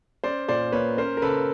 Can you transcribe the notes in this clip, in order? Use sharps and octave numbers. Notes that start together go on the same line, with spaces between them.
C#4 C5 D5
A#2 C5 D5
A#3 B4 C#5
C#4 A#4 C5
A#4
C#3 A4 B4